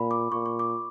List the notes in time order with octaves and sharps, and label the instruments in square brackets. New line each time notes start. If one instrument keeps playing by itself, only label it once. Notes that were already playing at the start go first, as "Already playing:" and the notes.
Already playing: [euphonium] A#2 [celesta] B5
[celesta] D6
[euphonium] A#2 [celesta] C#6
[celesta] C#6
D6